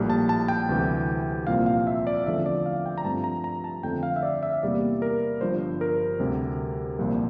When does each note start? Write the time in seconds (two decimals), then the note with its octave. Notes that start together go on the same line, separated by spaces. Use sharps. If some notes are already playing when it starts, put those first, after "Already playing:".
Already playing: A#1 A2 G3 A#3
0.10 A5
0.29 A5
0.48 G5
0.69 D2 C3 E3 G3
1.47 C2 A#2 F3 C4 F5
1.66 F5
1.87 E5
2.07 D5
2.26 E2 D3 F3 A3 C4 E5
2.46 D5
2.66 F5
2.86 G5
2.98 A#5
3.04 G2 F3 A3 C4 A5
3.24 A#5
3.44 A#5
3.64 A5
3.83 F2 D3 A3 C4 G5
4.03 F5
4.16 E5
4.23 D5
4.43 E5
4.63 E2 C3 G3 A#3 D5
5.02 A#4
5.41 G1 G2 F3 C5
5.81 A#4
6.19 D2 C3 G3
6.99 C2 A#2 F3